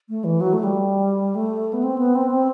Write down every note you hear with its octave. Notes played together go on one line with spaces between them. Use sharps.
A3
E3
F#3
A3
G3
A3
B3
C4
B3
C4
C4